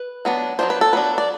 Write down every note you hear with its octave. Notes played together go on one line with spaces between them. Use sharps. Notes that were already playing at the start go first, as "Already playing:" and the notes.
Already playing: B4
F#3 B3 D4
F#3 B3 D4 C5
B4
A4
F#3 B3 D4 B4
D5